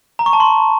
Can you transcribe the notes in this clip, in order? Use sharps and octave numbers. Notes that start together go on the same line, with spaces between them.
A#5
C#6
A5
C6